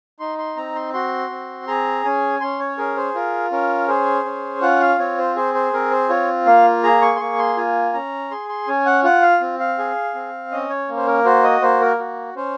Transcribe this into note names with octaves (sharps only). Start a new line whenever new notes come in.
D#4 C6
C6
C4 A#5
C6
F#4 C6
C4
G#4 A#5
C#4 G#5
C#4 C6
C#5
G#4 A#4
C5
F4 A#4
C#4 A#4
G#4 C5
C#4
F4 F#5
F5
C4 C#5
C5
G#4 C5
C5
C4 A#4
C5
F4 C#5
A#3 F5
G#4 A#5
C#6
C6
A#3 C#6
C6
F4 G#5
C#4 A#5
G#4 C6
C6
C#4 G#5
F#5
F4 F#5
F5
C4
F5
G#4
C4
C#4 D#5
C#5
A#3
C5
A#4
F#4 C5
D#5
A#3 C5
A#4
F#4
C#4 C5